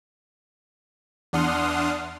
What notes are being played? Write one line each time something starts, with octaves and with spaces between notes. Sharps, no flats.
E2 D4 F#5 C6 D#6 F6